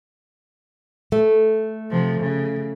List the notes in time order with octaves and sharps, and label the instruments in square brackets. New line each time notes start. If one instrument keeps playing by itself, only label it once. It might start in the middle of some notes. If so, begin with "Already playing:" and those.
[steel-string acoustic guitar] A3
[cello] C3 F3
C#3